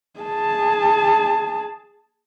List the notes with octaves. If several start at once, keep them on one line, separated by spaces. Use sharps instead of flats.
G#4 A5